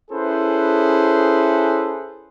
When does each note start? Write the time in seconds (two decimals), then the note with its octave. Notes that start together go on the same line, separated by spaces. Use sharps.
0.11 C#4 E4 G#4 A4 B4 C5